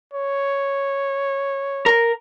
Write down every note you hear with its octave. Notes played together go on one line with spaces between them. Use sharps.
C#5
A#4